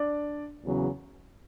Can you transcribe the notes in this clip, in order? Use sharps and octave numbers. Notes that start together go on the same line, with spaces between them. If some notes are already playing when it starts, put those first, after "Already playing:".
Already playing: D4 D5
E2 C#3 F#3